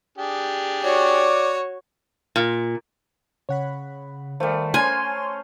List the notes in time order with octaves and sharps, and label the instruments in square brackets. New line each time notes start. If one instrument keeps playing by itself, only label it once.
[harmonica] D4 G4 G#4
[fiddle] F#4 C#5 [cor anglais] D5
[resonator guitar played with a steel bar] A#2
[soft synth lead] C#3 [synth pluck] C#5 F#5 B5
[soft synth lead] D#3 [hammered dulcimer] G3 A3 [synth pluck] A#4 C5 F5
[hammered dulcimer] C#4 C5 [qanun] G#5 [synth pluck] A#5 [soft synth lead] C6